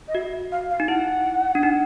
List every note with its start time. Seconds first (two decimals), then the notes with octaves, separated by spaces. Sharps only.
0.08 D#5
0.15 F#4 E5
0.52 F5
0.70 F5
0.80 D#4
0.88 E4 F#5
1.55 D4
1.63 D#4